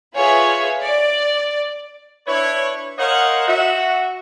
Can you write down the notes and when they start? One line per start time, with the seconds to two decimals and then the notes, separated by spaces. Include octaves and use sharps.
0.14 F4 G#4 B4 C#5 E5
0.81 D5
2.27 D4 E4 B4 C#5
2.99 A#4 C5 C#5 D#5 F5 F#5
3.48 F#4 E5